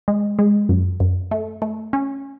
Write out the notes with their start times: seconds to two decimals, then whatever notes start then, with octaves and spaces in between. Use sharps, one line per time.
0.08 G#3
0.39 G#3
0.69 F#2
1.00 F#2
1.31 A3
1.62 A3
1.93 C#4